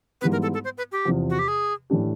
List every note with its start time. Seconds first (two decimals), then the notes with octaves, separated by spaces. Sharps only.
0.21 G#2 E3 G3 B3 B4
0.32 A#4
0.42 A4
0.54 A4
0.64 C5
0.78 B4
0.92 G4
1.05 E2 C3 F3
1.30 F#4
1.39 G4
1.48 G#4
1.90 A2 E3 A3 D4 G4